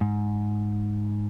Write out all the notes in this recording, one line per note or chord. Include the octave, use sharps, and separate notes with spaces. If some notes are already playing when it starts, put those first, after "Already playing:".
G#2